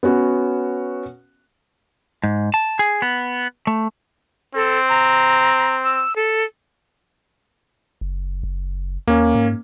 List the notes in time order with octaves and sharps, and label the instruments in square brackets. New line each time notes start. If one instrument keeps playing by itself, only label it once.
[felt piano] B3 C#4 F#4
[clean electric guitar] G#2
A5
G#4
B3
A3
[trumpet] C4 [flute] A4
[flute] A#5
E6
A4
[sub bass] F#1
F#1
[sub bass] D#2 [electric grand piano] A#3 C#4
[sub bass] G#2